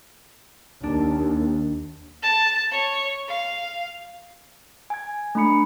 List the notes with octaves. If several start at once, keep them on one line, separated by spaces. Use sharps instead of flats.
D#2 D4
A5
C#5
F5
G#5 G#6
A3 D4 B5 C#7